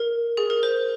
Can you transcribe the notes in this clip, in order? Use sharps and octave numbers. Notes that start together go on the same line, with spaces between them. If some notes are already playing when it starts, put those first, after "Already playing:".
Already playing: A#4
G#4
A#4
C5